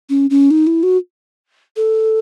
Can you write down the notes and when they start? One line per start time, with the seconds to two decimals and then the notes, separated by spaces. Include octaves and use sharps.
0.10 C#4
0.30 C#4
0.51 D#4
0.67 E4
0.83 F#4
1.76 A4